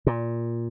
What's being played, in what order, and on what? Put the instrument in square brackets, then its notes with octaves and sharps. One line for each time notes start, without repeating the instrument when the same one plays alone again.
[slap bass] A#2